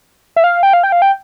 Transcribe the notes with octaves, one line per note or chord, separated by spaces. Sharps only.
E5
F5
G5
F5
G5
F5
G5